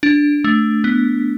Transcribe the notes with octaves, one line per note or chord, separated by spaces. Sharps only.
D4
A3
B3